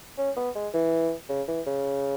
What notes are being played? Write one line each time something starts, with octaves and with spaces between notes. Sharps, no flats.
C#4
B3
G#3
E3
C#3
E3
C#3